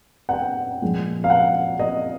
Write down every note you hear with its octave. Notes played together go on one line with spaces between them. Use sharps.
F#5
G5
A#2 F3 G#3
F5
F#5
D#5